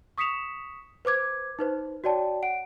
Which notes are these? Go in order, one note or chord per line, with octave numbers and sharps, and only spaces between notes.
C#6 D#6 B6 C#7 E7 F7
B4 C5 D6 G#6
D#4 B4 C5
F#4 C#5 D5 G5 A5
F#5 D7